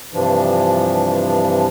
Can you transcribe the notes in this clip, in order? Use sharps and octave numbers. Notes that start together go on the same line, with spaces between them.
G2 C3 E3 F3 D4